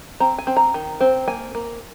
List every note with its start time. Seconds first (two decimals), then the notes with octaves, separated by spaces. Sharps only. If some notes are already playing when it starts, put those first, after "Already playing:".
0.20 C4 A#5
0.38 G#5
0.47 C4
0.57 A#5
0.74 D#3
1.01 C4
1.28 A#3 G#5
1.55 A#3